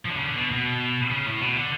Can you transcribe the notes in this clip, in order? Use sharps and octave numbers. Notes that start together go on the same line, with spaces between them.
F3
D3
C#3
D3
B2
B2
C#3
A2
B2
D3